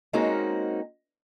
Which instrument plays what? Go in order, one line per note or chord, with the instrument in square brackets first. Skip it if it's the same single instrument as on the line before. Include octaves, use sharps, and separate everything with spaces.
[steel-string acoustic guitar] G#3 A#3 C4 C#4 D#4 F#4